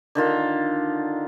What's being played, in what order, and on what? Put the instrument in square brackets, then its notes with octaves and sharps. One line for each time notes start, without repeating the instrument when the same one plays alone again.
[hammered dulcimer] D3 D#3 F4